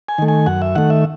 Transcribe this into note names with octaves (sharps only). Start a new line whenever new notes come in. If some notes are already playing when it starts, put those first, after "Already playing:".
G#5
D#3 A3
G#5
F#2 F#5
E5
D#3 A3 F#5
E5